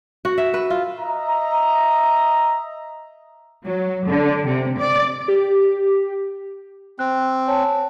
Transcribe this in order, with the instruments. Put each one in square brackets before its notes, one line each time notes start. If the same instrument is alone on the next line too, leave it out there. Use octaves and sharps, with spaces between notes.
[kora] F#4
E5
B4
F4
[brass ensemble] D#5 E5 A#5
[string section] F#3
D3
C3
D5
[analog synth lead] G4
[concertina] C4 [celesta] F#6
[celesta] C#5 G#5 A5